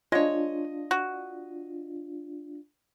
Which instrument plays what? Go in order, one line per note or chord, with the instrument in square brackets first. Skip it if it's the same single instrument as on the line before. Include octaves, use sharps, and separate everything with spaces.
[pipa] G#3 C#5 [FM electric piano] D4 F4 [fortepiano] D#5
[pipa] F#4